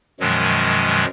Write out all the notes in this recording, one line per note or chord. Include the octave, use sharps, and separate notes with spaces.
F#2 B2 D#3 F3 F#3 G#3